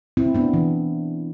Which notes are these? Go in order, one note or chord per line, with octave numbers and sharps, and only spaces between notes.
C4 E4
B3 D4
E3